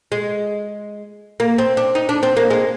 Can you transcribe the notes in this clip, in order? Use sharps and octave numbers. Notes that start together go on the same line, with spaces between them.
G#3
A#3
C4
D4
D#4
D4
C4
A#3
G#3